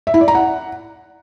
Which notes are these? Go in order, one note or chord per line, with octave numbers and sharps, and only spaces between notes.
E5
E4
D5
A#5
F#5